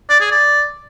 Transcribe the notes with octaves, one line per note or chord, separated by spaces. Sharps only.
D5
G#4
D5